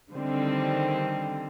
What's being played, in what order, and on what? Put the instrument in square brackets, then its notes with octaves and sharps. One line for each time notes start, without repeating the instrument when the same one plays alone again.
[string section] D3 D#3 G3 C4